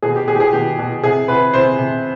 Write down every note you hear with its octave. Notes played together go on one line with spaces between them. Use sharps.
B2 G#4
G4
B2 G#4
G4
G#4
B2 G4
B2
C3 G#4
C3 B4
C3 C5
C3